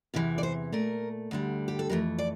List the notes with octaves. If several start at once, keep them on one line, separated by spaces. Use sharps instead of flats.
E2 C3 E3
D5
C5
A#2 A3 A#4
D2 D3 G3
G4
A4
F2 E3 A3 A#4
D5